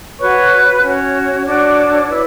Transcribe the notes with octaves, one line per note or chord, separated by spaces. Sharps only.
F#4 B4 C#5 C#6
C#4 F#4 C#5
D4 F#4 A4 C#5 D5 D6
E4 B4